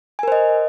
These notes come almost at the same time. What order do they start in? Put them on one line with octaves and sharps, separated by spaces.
G#5 A#4 C5 D#5